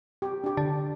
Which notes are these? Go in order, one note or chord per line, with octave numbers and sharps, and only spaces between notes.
G4
D4 G4
D3